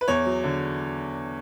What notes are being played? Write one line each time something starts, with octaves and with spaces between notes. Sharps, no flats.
B4
E2 C#5
F#3
D3